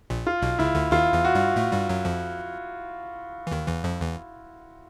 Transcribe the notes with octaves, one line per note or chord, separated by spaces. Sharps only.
A#1 A#2
F4
B1 B2
C#2 C#3 E4
D2 D3
D#2 D#3 F4
E2 E3
F#4
G2 G3
A2 A3
G2 G3
F#2 F#3
F2 F3
E3
D#2 D#3
E2 E3
F2 F3
E2 E3